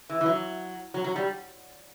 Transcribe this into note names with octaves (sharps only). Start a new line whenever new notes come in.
E3
E3
F#3
F#3
F#3
G3